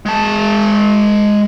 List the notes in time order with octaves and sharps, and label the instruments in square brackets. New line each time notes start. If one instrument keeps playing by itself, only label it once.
[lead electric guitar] G#3 A5